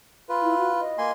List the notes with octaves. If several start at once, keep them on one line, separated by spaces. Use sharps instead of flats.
F4 B4
E4
F#4
D#5
A#3 G#5 C6